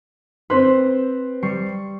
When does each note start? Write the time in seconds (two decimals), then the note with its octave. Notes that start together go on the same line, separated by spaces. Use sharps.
0.50 C4 B4 C5 C6
1.42 G3 C#6 C7